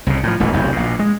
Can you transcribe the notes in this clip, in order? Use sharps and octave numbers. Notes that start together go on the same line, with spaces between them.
C2 C#3
A2 F3
E1 A1 B2 E3
F1 B1 E2
A#1 B2
G#3